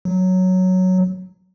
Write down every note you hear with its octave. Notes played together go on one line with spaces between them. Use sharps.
F#3